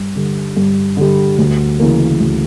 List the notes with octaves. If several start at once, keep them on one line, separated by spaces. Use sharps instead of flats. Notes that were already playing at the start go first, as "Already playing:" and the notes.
Already playing: G2
D3 G3
G2
D3 G3
D2
C#3 E3 A#3
D2